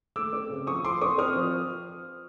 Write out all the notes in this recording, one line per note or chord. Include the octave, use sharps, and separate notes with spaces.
A3 D6 E6
C4
C#3
F3 C#6 D#6
F3 C6 D6
C4 C#6 D#6
C4 D#6 F6
F3